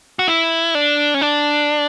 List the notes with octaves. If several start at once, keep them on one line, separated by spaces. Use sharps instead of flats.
F#4
E4
D4
C#4
D4